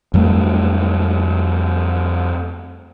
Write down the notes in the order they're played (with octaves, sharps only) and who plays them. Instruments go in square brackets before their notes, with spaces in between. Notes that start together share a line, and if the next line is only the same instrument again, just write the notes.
[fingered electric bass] F2 F#3 G3 A3